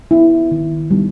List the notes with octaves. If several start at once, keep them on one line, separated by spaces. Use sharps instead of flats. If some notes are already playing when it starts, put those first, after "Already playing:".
B3 E4
D#3
G3 B3 D#4